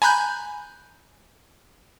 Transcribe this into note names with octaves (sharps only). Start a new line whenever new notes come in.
G#5 A#5 B5 F#6 G6